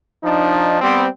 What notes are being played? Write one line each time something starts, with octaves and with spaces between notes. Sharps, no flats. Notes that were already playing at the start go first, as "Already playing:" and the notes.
F3 D4 D#4
G3 B3 C4